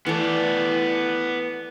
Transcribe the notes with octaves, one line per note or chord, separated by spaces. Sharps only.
E3 A3 B3 D5